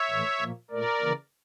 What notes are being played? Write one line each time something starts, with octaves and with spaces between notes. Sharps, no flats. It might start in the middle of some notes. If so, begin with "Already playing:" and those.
Already playing: C#5 E5
A2 E3 A3
A#2 F3 A#3
A#2 A3 A#4 D5
C#3 E3 A#3